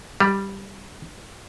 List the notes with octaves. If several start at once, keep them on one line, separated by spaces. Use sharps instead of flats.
G3